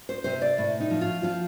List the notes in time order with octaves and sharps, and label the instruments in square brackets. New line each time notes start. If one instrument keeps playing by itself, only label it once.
[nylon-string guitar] C5
C3 C5
D5
A2
D#4
F3
F4
F3 F4